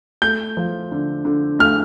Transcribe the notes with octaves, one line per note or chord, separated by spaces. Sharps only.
A3 G6
F3
D3
D3
A3 F6